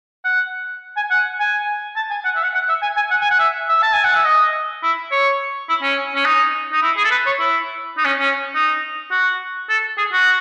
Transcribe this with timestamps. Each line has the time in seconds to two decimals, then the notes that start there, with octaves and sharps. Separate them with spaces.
0.24 F#5
0.96 G#5
1.10 F#5
1.40 G#5
1.96 A5
2.10 G#5
2.25 F#5
2.36 E5
2.44 F#5
2.54 F#5
2.69 E5
2.82 G#5
2.96 G#5
3.10 F#5
3.21 G#5
3.30 F#5
3.39 E5
3.69 E5
3.82 A5
3.93 G#5
4.04 F#5
4.15 E5
4.25 D#5
4.83 E4
5.12 C#5
5.69 E4
5.82 C#4
6.15 C#4
6.25 D#4
6.72 D#4
6.83 E4
6.97 G#4
7.04 A4
7.11 B4
7.26 C#5
7.40 E4
7.97 D#4
8.05 C#4
8.19 C#4
8.55 D#4
9.11 F#4
9.69 A4
9.97 G#4
10.12 F#4